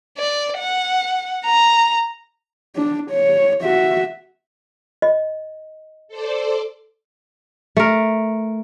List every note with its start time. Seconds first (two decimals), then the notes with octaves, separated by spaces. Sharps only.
0.18 D5
0.58 F#5
1.45 A#5
2.76 D4
3.11 C#5
3.62 F#4 E5
5.02 D#5
6.08 A4 C5 D5
7.77 A3 A#4